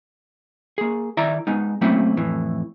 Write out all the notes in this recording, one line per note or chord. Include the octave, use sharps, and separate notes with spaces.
A#3 G#4
D#3 E4 D5 E5 A#5
G#3 B3 D#4
F#3 A3 A#3 C4 C#4 E4
F2 A2 E3